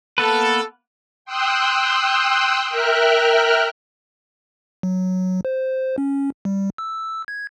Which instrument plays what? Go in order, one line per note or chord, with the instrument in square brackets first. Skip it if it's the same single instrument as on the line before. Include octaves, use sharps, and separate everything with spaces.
[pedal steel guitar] A#3 B3 B4 [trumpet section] A4
[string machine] G5 C6 D#6 E6 F#6
A#4 E5 G5 F6 F#6
[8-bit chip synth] F#3
C5
C#4
G3
E6
G#6